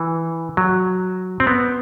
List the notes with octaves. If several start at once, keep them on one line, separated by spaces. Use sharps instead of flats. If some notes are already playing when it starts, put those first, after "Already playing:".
Already playing: E3
F#3
C4
B3